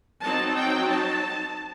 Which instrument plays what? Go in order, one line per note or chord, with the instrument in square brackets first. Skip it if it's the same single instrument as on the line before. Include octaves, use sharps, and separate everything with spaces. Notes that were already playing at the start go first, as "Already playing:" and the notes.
[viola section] F#3 C4 D#4 A5
G5
A5